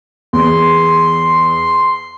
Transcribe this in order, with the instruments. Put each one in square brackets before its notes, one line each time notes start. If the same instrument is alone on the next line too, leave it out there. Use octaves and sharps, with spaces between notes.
[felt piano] E2 [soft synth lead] C6